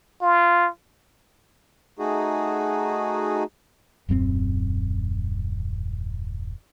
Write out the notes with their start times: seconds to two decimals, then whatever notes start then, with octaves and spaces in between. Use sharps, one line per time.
0.22 F4
1.99 A3 D#4 F#4 G#4
4.09 D#1 F#2 G#3 C4